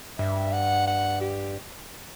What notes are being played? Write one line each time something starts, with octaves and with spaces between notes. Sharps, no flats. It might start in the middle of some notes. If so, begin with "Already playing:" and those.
G2 E5
F#5
F#5
G4